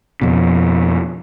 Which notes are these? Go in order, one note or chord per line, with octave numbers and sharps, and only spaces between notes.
F2 B2